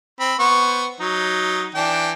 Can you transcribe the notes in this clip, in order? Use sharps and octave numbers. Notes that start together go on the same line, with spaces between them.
C4 B5
B3 C5 C#6
F#3 D#4
E3 D4 G5